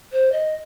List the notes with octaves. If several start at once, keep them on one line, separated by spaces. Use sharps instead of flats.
C5
D#5